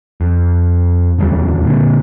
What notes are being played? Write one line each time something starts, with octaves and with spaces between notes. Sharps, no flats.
F2
D1 E2 C3 G3
A#2 D3